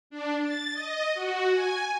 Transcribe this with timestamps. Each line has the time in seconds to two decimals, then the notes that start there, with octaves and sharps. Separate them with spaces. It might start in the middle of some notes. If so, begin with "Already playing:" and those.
0.10 D4
0.43 A6
0.74 D#5
1.14 F#4
1.51 G#5